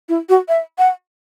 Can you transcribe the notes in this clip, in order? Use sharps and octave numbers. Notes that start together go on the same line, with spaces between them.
E4
F#4
E5
F#5